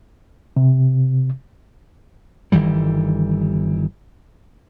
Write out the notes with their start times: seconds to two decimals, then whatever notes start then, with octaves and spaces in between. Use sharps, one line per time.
0.57 C3
2.52 G1 D#3 E3 G3